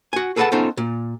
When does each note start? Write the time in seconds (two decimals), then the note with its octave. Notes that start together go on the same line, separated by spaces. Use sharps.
0.13 F#4 G#5
0.36 G#4 A4 B4 D#5 F#5 A5
0.52 B3 C#4 D#4 F4 A4 C5
0.77 A#2